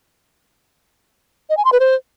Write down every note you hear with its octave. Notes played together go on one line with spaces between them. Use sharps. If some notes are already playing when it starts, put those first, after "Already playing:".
D#5
G#5
C6
B4
C5